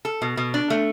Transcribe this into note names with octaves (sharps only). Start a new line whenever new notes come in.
A4
B2
B2
D4
A3